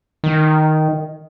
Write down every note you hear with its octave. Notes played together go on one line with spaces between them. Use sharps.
D#3